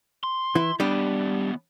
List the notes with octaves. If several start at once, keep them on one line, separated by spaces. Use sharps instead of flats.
C6
E3 E4
D#2 G3 B3 D4 G4